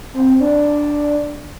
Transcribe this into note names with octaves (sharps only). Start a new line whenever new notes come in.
C4
D4